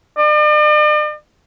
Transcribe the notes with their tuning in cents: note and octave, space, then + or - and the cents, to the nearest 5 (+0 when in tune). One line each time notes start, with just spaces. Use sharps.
D5 +45